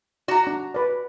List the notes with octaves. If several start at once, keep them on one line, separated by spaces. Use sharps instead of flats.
F#4 D5 A#5
D4
B4 D5